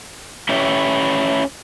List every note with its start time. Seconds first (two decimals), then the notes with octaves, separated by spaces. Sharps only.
0.49 A3 C#4 E4 G4 B4